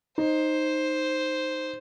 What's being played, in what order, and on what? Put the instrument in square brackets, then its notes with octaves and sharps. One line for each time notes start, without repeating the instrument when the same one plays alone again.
[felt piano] D#4 [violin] C5